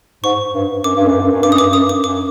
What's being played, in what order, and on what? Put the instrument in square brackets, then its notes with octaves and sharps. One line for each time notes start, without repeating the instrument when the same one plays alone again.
[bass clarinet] G#2 [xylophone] C#6
[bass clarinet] G2
[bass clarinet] F#2 [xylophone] D6
[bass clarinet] G2
F#2
G2
F#2
[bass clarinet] G2 [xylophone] D6
[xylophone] D#6
[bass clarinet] F#2 [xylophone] D6
[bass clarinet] G2
[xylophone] D#6
[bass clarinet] F#2
[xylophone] D6
[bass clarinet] F#2 [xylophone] D6